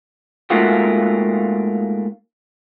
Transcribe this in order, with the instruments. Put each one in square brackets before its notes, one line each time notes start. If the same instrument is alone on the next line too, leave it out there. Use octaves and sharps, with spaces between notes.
[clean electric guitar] G#2 A3 A#3 F4 F#4